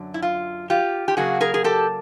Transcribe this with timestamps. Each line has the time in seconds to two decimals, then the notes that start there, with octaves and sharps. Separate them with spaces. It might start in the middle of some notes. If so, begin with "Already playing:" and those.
Already playing: F#2 D3 F#3
0.14 E4
0.22 F4
0.70 F4 G4
1.08 G4
1.17 C#3 F#3 A#3 F#4 G#4
1.41 G#4 A#4
1.54 G#4
1.64 G4 A4